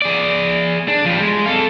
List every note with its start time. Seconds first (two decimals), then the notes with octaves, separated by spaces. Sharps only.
0.02 G#4 D5
0.88 D4
1.06 F3 G3
1.20 G#3
1.46 A4 F5